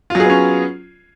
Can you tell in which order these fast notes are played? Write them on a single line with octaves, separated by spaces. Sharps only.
F4 F#3 G#4 B3 C#4